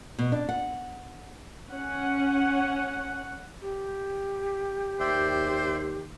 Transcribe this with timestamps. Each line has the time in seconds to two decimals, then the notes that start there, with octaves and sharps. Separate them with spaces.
0.19 B2
0.32 D4
0.49 F#5
1.70 C#4 F#5
3.61 G4
5.00 D#2 C5 D5 E5 G5